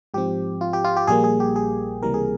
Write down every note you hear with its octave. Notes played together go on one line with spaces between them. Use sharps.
G#2 F3 C4 G4
F4
G4
F4
G4
A#1 A#2 G3 A#3 G#4
G#4
G4
G#4
C#2 C3 E3 G3 A#3 A#4
G#4